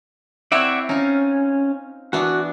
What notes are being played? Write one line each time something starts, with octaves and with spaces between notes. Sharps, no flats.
C4 E4 C#5 D5 E5 F#5
C#4 D#4 F4
E3 B3 D4 F#4